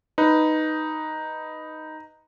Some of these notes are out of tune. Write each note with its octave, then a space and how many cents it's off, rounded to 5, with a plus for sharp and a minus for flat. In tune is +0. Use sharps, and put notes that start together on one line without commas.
D#4 +0 B4 +0